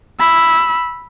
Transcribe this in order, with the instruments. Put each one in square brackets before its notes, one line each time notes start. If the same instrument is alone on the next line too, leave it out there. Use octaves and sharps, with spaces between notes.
[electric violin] B5 E6